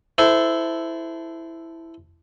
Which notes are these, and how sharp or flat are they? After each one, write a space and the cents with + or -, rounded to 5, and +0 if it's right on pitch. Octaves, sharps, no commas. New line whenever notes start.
E4 +0 A4 +0 C5 -20